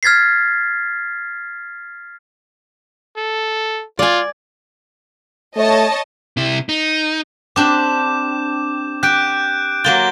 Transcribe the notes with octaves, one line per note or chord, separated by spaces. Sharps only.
F6 G#6 A6 B6 C7
A4
F4 D5 G#5
A3 C#5 D#5 A5
C3 E4
D#4
C4 D4 G4 D6 G6 E7
G4 F#6 G6 D7
F#3 A#3 F4 G6 A6 G7